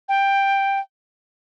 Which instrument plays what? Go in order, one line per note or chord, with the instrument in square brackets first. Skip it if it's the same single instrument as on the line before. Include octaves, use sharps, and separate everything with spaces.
[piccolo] G5